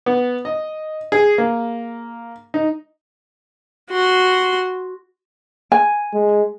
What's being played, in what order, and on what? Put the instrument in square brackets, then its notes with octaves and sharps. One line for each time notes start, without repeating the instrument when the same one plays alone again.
[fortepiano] B3
D#5
G#4
A#3
D#4
[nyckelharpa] F#4 C6
[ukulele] G#5
[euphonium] G#3